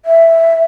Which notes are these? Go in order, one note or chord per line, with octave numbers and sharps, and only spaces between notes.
E5